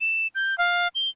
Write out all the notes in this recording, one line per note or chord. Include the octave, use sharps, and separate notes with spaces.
E7
G6
F5
G7